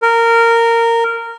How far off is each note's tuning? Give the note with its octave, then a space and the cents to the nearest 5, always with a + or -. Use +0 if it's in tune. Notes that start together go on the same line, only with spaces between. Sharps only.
A#4 -15